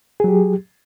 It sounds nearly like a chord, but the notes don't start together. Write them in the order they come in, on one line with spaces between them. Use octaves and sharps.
G#4 F#3 G4